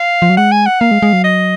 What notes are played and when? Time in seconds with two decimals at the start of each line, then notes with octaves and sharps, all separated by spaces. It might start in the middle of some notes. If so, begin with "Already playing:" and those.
Already playing: F5
0.22 F3
0.30 F#3
0.37 G#3 F#5
0.52 G#5
0.66 F#5
0.80 A#3 F5
0.91 G#3
1.02 G#3
1.13 F#3
1.24 D#5